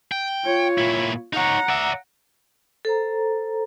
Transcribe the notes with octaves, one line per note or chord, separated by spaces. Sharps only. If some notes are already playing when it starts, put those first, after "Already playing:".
G5
F4 C#5
A#2 E4
D#4 C#5 F#5 A#5
D5 E5
A4 C5 A#5